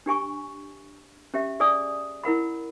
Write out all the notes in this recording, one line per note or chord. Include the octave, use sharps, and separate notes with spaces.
D4 G4 G#5 C#6
C#4 G4 E5
G#4 D5 G#5 D#6
E4 A#4 F#5 B5